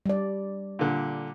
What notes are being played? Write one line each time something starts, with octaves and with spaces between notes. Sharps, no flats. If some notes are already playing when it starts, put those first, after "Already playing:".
G3 D5
A#2 D3